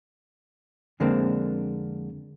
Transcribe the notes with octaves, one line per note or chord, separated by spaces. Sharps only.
F2 D3 G#3 A#3 C4 D4